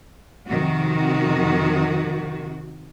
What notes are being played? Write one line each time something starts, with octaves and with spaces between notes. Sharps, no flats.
F2 C3 D#3 F#4